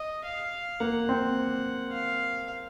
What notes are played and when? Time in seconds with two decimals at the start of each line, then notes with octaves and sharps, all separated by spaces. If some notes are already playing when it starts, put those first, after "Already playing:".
Already playing: D#5
0.24 F5
0.80 A#3 F#5
1.09 C4
1.92 F5